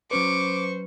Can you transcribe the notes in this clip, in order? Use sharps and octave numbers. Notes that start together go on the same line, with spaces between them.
F#3 C#4 B4 C5 C#6 D6